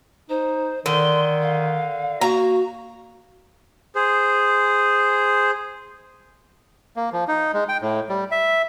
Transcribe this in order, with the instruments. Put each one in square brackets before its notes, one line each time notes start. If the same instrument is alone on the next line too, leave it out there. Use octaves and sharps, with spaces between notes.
[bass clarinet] D#4 [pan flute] C5
[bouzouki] D3 [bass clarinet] D#3 [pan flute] C6
[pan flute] F5
[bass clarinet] A#3 [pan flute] F#4 [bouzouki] A#5
[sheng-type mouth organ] G#4 C5
[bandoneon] A#3
F3
D#4
G#3
G5
A2
G3
E5